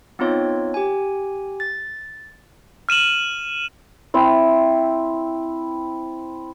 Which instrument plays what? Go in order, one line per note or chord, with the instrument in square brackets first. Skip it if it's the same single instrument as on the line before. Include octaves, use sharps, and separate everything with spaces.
[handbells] B3 C4 D#4 F4 C#5
G4 G#5
A6
[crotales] F6 D#7 E7 F#7
[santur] C4 E4